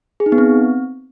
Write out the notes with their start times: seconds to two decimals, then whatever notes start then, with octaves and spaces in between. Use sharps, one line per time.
0.20 G#4
0.26 D#4
0.32 B3
0.38 C4